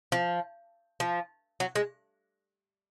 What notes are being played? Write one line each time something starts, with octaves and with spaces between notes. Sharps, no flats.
F3
F3
F#3
G#3